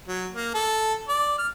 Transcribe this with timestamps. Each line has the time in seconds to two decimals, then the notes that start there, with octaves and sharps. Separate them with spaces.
0.08 F#3
0.34 A#3
0.54 A4
1.08 D5
1.38 F6